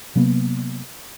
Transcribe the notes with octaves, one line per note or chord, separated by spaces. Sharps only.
C3 F#3 A#3 B3